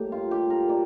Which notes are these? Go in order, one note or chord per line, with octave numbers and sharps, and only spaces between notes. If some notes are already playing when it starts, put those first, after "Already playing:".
Already playing: A2 G3 A#3 G4
F4
G4
A#4
A#3 D5